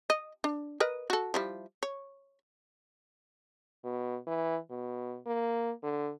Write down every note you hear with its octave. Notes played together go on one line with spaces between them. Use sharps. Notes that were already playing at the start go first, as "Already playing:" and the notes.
D#5
D4
A#4 B4 D#5
F#4 A4
F3 G3 E4
C#5
B2
E3
B2
A#3
D3